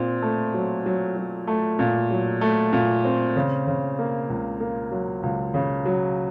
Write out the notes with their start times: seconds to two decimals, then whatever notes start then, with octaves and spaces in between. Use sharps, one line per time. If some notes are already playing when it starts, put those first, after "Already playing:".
Already playing: A#2 C4
0.22 A3
0.54 F#3
0.86 F#3
1.17 F#3
1.47 A3
1.79 A#2
2.11 F#3
2.41 A3
2.73 A#2
3.05 C4
3.36 C#3
3.67 C#3
3.99 A#3
4.30 C#2
4.60 A#3
4.91 F#3
5.23 C#2
5.54 C#3
5.86 F#3